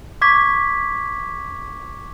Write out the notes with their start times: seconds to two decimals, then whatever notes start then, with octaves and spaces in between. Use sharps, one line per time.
0.22 C#6 D6 G#6 B6